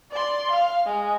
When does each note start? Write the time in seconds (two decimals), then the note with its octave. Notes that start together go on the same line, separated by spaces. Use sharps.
0.11 D5 C6
0.51 F5
0.86 G#3